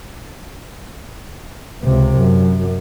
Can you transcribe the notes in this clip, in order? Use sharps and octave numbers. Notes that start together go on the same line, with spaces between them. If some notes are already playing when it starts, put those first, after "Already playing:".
C#2 C3
F#2